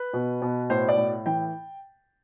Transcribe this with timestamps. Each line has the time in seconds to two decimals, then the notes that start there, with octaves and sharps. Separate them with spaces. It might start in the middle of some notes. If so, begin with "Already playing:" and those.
Already playing: B4
0.13 B2
0.42 B2
0.70 A2 C5
0.88 D5
0.97 A2
1.26 E3 G5